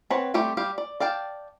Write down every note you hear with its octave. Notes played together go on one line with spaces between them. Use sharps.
C4 B4 C#5 F#5 B5
G3 A3 C4 G4 G5
G3 G4 F5
D5
D5 F5 G5 A5